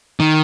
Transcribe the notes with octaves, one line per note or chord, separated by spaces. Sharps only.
D#3